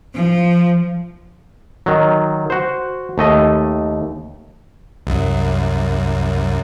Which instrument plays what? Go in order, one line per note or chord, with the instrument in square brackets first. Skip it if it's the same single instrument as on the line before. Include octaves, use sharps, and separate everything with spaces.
[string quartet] F3
[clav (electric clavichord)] D#3 F#3
F#4 C5
D#2 A3 D#5
[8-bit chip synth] C2 F#2